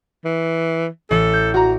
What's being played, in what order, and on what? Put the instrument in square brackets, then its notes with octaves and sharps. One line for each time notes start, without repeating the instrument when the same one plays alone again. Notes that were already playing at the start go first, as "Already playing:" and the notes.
[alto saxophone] E3
[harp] A1 [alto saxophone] A4
[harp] G6
[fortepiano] F#4 A#5